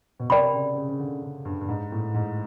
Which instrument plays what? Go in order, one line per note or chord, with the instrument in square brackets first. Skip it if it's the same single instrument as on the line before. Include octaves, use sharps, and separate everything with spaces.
[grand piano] B2
[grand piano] C3 [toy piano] A#4 D5 G5 B5
[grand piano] C#3
C#3
C#3
D3
C#3
G2
G2
G#2
A2
G#2